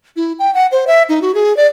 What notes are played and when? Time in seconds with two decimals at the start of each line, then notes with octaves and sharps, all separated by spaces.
0.16 E4
0.39 G5
0.54 F#5
0.72 C5
0.87 E5
1.09 D#4
1.22 F#4
1.35 G#4
1.57 D5